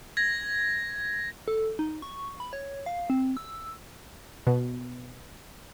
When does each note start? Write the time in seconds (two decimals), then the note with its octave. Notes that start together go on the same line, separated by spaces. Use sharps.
0.17 G#6 A#6
1.48 A4
1.79 D#4
2.02 C#6
2.40 B5
2.53 C#5
2.86 F5
3.10 C4
3.37 E6
4.47 B2